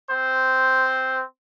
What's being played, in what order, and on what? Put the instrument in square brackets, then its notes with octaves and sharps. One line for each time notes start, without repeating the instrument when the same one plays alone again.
[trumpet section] C4 C5